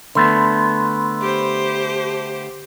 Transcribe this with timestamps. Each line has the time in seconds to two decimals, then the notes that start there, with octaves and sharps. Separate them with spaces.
0.15 D3 A3 B3 B5 C6
1.21 G4 C5